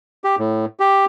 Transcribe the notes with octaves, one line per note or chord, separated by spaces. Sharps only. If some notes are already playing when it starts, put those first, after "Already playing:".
G4
A2
G4